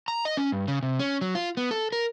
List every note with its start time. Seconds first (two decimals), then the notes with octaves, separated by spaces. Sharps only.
0.08 A#5
0.25 D#5
0.37 C#4
0.52 G2
0.68 C#3
0.83 C3
0.99 C#4
1.21 F#3
1.35 F4
1.57 B3
1.71 A4
1.92 A#4